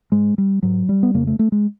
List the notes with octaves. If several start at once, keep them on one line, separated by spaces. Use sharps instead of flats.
G#2 G#3
G3
G#2 F#3
G3
B3
F2 C#3 A#3
A3
A3
G#3